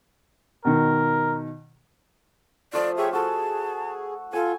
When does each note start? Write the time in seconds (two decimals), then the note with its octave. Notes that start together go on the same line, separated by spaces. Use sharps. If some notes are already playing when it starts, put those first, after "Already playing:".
0.65 B2 D#3 A#4
2.73 F3 A3 F4 D5
2.97 G4 G#4 C#5 E5
3.13 F#4 G#4 A4 A5
4.33 F4 A4 G#5